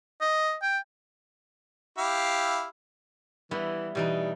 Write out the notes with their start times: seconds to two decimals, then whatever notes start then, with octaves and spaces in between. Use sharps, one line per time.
0.21 D#5
0.62 G5
1.98 E4 G4 F5
3.51 E3 G3 B3 E4
3.95 B2 E3 G3 D#4